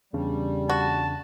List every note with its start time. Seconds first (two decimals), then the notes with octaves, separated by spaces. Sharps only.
0.13 E2 C#3 G3 D4
0.69 F#4 A5